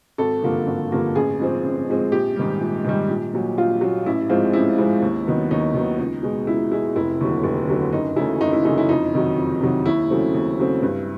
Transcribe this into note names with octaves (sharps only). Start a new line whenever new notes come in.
G#1 A4
G2 D3 F3 A#3
G#1
G2 D3 F3 A#3
A1 G#4
G#2 F3 G#3 C4
A1
G#2 F3 G#3 C4
A#1 G4
G#2 D#3 G3
A#1
G#2 D#3 G3
A#1
A#2 F#3
A#1 F4
A#2 F#3
A1 E4
G#2 F3 G#3 C4 F4
A1 E4
G#2 F3 G#3 C4
D#2
D#3 F#3 B3
D#2 D#4
D#3 F#3 B3
C#2
B2 G#3
C#2 E4
B2 G#3 E4
F1 E4
D#2 D3 F#3
F1
D#2 D3 F#3
F#1 D#4
F#2 C#3 E3 A3 E4
F#1 D#4
E4
F#2 C#3 E3 A3 D#4
E4
F2 D#4
C3 D#3 F#3
F2
C3 D#3 F#3
D#2 E4
C#3 F#3 A3 C4
D#2
C#3 F#3 A3 C4
G2